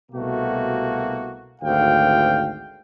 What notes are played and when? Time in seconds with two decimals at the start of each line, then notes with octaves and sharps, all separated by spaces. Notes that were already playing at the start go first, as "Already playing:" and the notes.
0.12 C2 B2 A3 A#3 F#4
1.62 G#1 D2 F5 G5